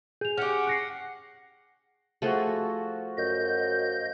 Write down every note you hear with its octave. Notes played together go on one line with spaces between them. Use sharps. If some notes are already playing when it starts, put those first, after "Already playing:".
G#4 G6 F7
C#4 G4 F#5 F6
F#6 A#6 C7
F3 A3 F#4 G#4 A4
F#2 D#5 G6